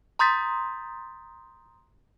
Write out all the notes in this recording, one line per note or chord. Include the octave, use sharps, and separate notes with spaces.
A#5 C6 D#6 G6 A6 B6